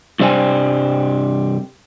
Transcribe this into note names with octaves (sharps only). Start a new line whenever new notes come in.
G2 C3 G3 C5 G5 G#5